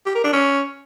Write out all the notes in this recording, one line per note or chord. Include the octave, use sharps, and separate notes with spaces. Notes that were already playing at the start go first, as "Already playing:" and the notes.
G4
A#4
D4
C#4